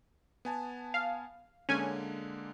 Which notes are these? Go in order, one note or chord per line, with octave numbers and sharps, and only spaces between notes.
B3 G#5 A5
F5
D3 G#3 A#3 C#4 G#5